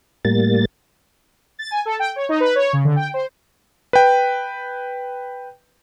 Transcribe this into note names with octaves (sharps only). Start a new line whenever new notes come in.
A2 G3 A#3 A6
A6
G#5
A4
G5
C#5
D#4
B4
C#5
C#3
D3
G5
C5
B4 G5